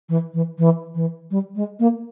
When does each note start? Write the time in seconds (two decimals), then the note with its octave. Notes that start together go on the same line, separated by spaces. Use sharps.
0.09 E3
0.34 E3
0.58 E3
0.95 E3
1.31 G3
1.56 G#3
1.80 A#3